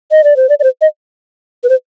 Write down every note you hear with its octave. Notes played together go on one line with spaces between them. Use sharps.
D#5
D5
C5
D5
D5
C5
D#5
B4
C5